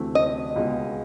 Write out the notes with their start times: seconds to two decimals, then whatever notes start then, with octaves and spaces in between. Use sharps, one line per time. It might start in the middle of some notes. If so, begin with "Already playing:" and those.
Already playing: D2 C3 E3 A3 C4
0.15 D#5
0.56 C#2 B2 G#3